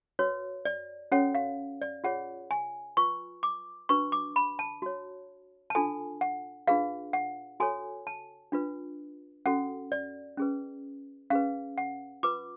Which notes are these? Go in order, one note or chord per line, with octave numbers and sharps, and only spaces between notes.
F#4 B4 C#5
D5
C#4 F#4 A4 C#5 F#5
F5
D5
F4 G#4 C#5 F#5
G#5
F4 B4 C#6
D6
D4 F#4 B4 C#6
D6
B5
A5
F#4 C#5
A5
D4 F4 A4 G#5
F#5
D4 F4 G#4 B4 F5
F#5
F#4 A4 C#5 G#5
A5
D4 F4 B4
C#4 F#4 A4 F#5
D5
C#4 G#4 B4
C#4 G#4 B4 F5
F#5
F4 B4 D6